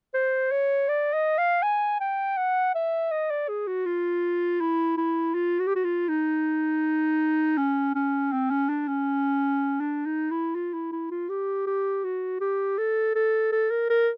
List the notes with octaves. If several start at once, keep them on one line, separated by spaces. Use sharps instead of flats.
C5
C#5
D5
D#5
F5
G#5
G5
F#5
E5
D#5
D5
G#4
F#4
F4
E4
E4
F4
F#4
G4
F#4
F4
D#4
C#4
C#4
C4
C#4
D4
C#4
D4
D#4
E4
F4
E4
E4
F4
G4
G4
F#4
G4
A4
A4
A4
A#4
A#4